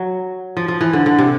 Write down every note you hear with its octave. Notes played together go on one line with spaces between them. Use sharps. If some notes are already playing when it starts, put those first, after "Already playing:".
Already playing: F#3
F3
F3
E3
D3
D3
C3